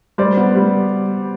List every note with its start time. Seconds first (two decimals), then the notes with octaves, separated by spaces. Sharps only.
0.18 G3 C5 D5
0.37 B3
0.55 G3